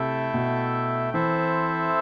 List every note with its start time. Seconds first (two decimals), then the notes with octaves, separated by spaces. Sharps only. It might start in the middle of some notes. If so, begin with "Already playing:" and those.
Already playing: C3 A3 E4 A4 E5 G5
0.34 B2
1.14 E3 C4 E4 A4 C5 E5